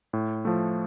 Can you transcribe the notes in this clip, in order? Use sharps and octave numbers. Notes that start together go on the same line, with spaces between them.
A2
F3 A3